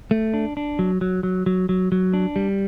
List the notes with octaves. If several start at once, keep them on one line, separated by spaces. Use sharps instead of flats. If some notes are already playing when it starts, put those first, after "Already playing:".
A3
D4
D4
F#3
F#3
F#3
F#3
F#3
F#3
D4
G3